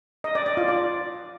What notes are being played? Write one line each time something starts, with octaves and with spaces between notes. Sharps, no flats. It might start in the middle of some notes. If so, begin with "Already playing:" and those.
D#5
D5
D5
F4
D5